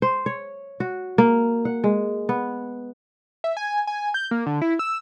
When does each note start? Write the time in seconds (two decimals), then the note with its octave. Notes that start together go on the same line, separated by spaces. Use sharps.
0.02 C5
0.26 C#5
0.80 F#4
1.18 A#3
1.65 F#5
1.84 G#3
2.29 B3
3.44 E5
3.57 G#5
3.87 G#5
4.14 G6
4.31 A#3
4.46 D3
4.62 E4
4.79 E6